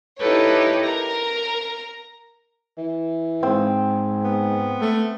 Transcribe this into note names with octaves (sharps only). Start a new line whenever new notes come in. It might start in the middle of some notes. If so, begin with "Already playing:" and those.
D#4 E4 G4 A4 B4 C#5
A#4 A#5
E3
G#2 C4
B3
A3